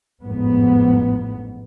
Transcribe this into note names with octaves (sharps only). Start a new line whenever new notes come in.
A1 F2 G#2 B3